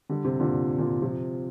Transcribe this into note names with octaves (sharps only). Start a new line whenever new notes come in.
D3 G3
C3
A#2 D3
A#2 D3
C3 F3